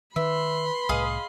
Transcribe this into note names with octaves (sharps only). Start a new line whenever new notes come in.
D#3 B4 E5 B5 C6
C2 A2 G#4 D#5 F5